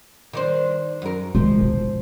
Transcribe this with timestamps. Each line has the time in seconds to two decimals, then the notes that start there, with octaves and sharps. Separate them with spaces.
0.33 D#3 D4 C5
1.02 F#2 A#4
1.35 A#2 F3 G#3
1.61 E1